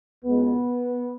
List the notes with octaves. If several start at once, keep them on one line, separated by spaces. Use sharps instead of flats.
C#2 B2 G#3 B3